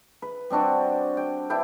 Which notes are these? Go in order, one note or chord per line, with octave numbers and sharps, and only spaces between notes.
B4
G3 C4 D4 F#4
G5
D4 E4 B4 G5